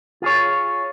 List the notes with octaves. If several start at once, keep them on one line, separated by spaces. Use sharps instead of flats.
F4 G#4 C#5